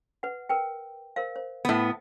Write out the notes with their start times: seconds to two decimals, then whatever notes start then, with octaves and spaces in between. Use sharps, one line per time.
0.23 B4 F#5
0.49 A#4 B4 G5
1.16 A#4 C5 F5
1.36 C5
1.65 A2 B3